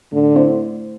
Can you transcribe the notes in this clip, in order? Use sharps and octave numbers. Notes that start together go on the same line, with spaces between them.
A2 D3
A3 C4 E4 C5